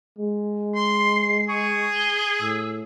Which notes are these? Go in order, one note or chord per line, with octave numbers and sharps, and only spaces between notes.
G#3
C6 C7
G#4 C#6
G7
A2 E6